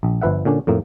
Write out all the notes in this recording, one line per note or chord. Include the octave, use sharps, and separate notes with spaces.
A#1
G1 F3 B4 E5 F#5
A#2 D3 C#4 D4
F2 A2 A#3